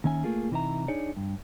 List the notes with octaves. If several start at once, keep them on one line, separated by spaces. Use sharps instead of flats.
D#2 D#3 C#4 E5 G#5
A3 A#3 F4 G#4
C3 E3 D#4 C5 E5 A#5
D4 D#4 G#4 C#5 D5
G2